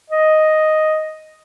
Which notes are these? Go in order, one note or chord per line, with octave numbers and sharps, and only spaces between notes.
D#5